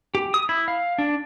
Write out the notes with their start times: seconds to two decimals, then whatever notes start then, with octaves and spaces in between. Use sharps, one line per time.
0.15 G4
0.34 D#6
0.49 E4
0.68 F5
0.98 D4